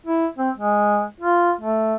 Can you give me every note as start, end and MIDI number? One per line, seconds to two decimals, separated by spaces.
0.07 0.27 64
0.38 0.50 60
0.57 1.03 56
1.21 1.52 65
1.61 1.96 57